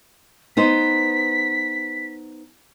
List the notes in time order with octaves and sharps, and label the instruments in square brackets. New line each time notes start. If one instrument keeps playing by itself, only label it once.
[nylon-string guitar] B3 D#4 C5 [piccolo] B6